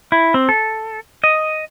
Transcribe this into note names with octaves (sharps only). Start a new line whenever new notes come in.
E4
C4
A4
D#5